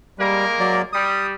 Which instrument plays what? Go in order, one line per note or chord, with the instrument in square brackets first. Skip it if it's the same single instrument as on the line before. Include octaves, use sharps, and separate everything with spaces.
[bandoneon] G3 [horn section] G#3 A#3 A#4
[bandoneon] F#3 D5
[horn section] G3 [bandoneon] D#6